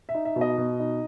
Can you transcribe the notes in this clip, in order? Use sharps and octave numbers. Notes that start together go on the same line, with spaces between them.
E5
D#4
E5
B2
D#5
B2
D#4